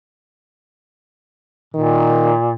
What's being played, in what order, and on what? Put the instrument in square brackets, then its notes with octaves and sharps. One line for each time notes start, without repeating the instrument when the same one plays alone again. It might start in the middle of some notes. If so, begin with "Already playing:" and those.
[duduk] A#2 [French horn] D#3